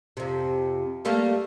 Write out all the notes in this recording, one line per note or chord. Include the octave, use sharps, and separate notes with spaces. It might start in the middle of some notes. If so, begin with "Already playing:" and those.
F2 C3
G3 A3 A#3